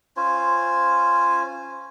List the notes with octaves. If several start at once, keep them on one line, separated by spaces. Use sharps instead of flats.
C#4 F4 C5 G#5